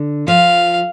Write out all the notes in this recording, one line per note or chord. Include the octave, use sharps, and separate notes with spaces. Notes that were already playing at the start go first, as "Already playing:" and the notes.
Already playing: D3
F3 F5